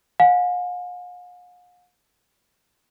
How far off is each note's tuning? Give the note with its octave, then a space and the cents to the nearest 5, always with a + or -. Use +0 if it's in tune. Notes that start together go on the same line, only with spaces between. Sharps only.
F5 +45 G#5 +0